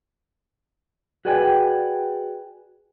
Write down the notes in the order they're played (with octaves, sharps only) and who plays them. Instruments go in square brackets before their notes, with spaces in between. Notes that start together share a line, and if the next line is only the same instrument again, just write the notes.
[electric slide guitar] F#4 G#4 B4 D5 G5 G#5